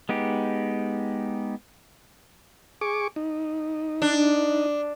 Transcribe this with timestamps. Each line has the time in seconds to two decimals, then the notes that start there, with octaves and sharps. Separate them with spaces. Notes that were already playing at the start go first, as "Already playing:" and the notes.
0.09 G#3 B3 D#4 G4
2.81 G#4 C#6 D6
3.16 D#4
4.02 D4